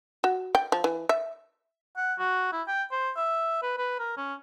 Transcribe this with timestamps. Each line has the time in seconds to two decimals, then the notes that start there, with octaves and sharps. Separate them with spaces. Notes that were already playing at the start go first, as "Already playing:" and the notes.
0.24 F#4
0.55 G5
0.72 F3
0.84 E3
1.09 E5
1.97 F#5
2.18 F#4
2.52 E4
2.67 G5
2.91 C5
3.16 E5
3.62 B4
3.78 B4
3.99 A#4
4.17 C#4